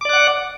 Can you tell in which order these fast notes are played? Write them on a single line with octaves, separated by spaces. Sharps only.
D6 D5 F#6 F#5